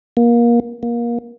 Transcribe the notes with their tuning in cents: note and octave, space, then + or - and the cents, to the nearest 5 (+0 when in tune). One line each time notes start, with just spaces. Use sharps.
A#3 +25
A#3 +25